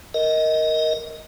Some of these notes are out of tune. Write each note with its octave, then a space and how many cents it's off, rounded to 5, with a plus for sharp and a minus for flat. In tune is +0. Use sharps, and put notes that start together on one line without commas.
A#4 +0 D#5 +15